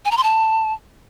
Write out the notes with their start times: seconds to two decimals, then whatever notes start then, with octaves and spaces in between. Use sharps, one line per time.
0.05 G#5
0.11 A#5
0.17 C6
0.23 A5